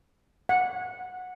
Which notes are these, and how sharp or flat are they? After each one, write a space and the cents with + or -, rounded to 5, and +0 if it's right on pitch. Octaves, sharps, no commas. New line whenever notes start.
F#5 -15